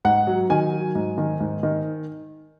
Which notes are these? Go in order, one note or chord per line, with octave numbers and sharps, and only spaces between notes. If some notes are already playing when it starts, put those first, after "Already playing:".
G#2 F#5
F#3
D#3 G#5
F#3
G#2
D#3
G#2
D#3